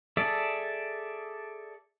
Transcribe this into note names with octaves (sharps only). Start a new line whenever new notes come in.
G#4 A4 D5 E5 A5